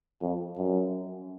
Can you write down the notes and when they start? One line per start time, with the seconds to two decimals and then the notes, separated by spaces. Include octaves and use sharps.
0.22 F2
0.57 F#2